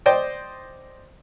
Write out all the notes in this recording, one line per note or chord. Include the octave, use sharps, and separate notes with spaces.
C5 D5 D#5 G5